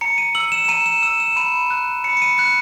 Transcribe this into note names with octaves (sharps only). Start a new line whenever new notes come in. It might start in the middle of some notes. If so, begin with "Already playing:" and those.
A#5 C#7
D#7
E6 F#7
E7
E7
A#5 D#7
E7
E6 E7
E7
B5 D#7
F#6
B5 C#7
C#7
D#7
F#6 C#7